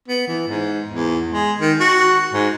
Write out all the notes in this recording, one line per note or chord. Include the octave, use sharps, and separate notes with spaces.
B3
E3
G#2
E2
G#3
D#3
F#4
G#2